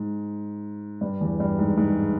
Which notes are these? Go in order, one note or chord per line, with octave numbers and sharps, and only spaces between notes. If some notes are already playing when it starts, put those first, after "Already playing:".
Already playing: G#2
G2
E2
G2
G#2
G#2